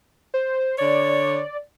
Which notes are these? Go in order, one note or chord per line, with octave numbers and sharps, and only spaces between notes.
C5
D3 C#5 D5